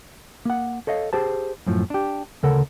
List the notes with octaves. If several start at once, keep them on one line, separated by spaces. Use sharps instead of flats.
A#3 F#5
A4 C#5 D#5 F5
G4 G#4 C5 A5
F#2 A2 F3
D4 G4
D2 C#3 A4 A#4 F#5